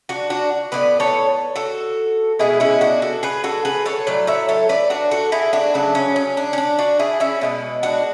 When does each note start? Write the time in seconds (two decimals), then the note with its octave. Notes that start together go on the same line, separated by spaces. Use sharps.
0.09 D4 F#4
0.30 D4 F#4
0.72 A2 E3 B3 B4 D5
1.00 A4 C#5
1.56 F#4 A4
2.39 B2 G#3 B3 E4 G#4
2.60 C#4 E4
2.81 D4 F#4
3.02 F#4 A4
3.23 G#4 B4
3.44 F#4 A4
3.65 G#4 B4
3.86 A4 C#5
4.07 A2 F#3 A3 D5
4.27 C#5 E5
4.49 A4 C#5
4.69 B4 D5
4.90 D4 F#4
5.11 F#4 A4
5.32 E4 G#4
5.53 D4 F#4
5.74 C#3 F#3 A3 D4
5.95 C#4
6.16 C#4
6.37 D4
6.53 C#4
6.58 D4
6.79 D4 F#4
6.99 E4 G#4
7.20 C#4 E4
7.41 B2 G#3 B3
7.83 D4 F#4